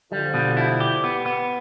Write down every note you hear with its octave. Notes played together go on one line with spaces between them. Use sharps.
D3 F3 G3
B2
E4
G4
B3
B3